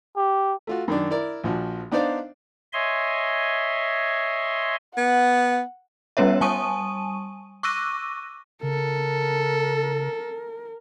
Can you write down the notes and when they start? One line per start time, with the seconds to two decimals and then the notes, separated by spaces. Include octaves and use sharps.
0.17 G4
0.67 A3 F4 F#4
0.88 F#2 D#3 D4
1.10 E4 A#4 D5
1.44 A#1 F3 F#4
1.91 B3 D4 D#4 C5 D5 F5
2.73 C#5 D#5 E5 G#5 C6
4.97 B3 F#5
6.17 G3 B3 C#4 B4 C#5 E5
6.41 G3 G#5 A5 C#6 D#6 D#7
7.63 C#6 D6 E6 F#6 A#6 D#7
8.63 C#3 A4 A#4